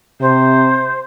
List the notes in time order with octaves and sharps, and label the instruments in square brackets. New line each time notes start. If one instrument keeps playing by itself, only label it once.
[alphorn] C3 [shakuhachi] C5